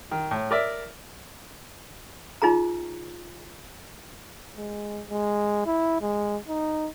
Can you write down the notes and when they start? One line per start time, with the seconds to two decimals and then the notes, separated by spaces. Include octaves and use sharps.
0.11 D#3
0.31 A2
0.51 A#4 D5 E5
2.42 D#4 F4 G#4 A#5
4.57 G#3
5.10 G#3
5.66 E4
6.01 G#3
6.48 D#4